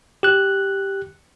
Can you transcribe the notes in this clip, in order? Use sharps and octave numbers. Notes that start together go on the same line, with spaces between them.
G4 F#6